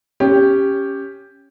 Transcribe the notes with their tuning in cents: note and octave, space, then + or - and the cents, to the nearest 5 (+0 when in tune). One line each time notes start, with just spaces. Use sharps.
C#4 +0 G4 +5